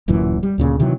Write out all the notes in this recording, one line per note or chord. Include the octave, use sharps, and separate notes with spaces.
D1 F#2 A#2 E3
G3
D2 A#2 C#3
C3 D#3 E3 F#3